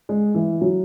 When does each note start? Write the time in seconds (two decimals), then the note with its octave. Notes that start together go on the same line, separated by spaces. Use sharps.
0.09 G#3
0.34 E3
0.61 F#3